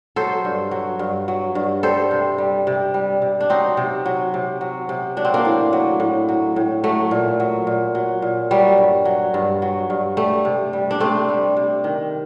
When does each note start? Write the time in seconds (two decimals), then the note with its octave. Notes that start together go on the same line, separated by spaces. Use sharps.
0.16 F#3 A4 C5
0.45 G2
0.71 F#3
0.99 G2
1.28 F#3
1.55 G2
1.83 G3 A4 C5
2.11 C3
2.38 G3
2.67 C3
2.94 G3
3.22 C3
3.41 D4
3.50 F#3 C4 D#4
3.77 C3
4.06 F#3
4.34 C3
4.61 F#3
4.89 C3
5.17 F#3 D4
5.25 C4
5.34 A#3 D4
5.45 A2
5.73 F#3
6.00 A2
6.29 F#3
6.56 A2
6.84 F#3 A3
7.11 A#2
7.40 F#3
7.67 A#2
7.95 F#3
8.22 A#2
8.51 F#3 G3
8.78 G2
9.05 F#3
9.34 G2
9.62 F#3
9.90 G2
10.17 G3 A3
10.45 C3
10.73 G3
10.91 D4
11.00 C3 A3 C4
11.29 G3
11.57 C3
11.84 D#3